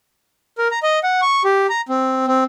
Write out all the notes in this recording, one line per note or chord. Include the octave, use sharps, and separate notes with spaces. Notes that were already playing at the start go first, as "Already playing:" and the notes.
A#4
A#5
D#5
F#5
C#6
G4
A#5
C4
C4